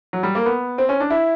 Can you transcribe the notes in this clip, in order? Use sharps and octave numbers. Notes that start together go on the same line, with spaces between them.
F#3
G3
A#3
B3
C4
C#4
D4
E4